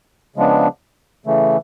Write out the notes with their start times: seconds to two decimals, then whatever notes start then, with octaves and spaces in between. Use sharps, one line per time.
0.36 C#3 F3 G#3 B3 D4
1.26 C#3 E3 A3